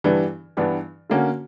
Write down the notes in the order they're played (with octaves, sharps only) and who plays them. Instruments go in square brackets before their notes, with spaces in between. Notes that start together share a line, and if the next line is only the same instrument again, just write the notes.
[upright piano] G2 E3 G3 B3 D4
G2 E3 G3 B3 D4
D3 A#3 C#4 F#4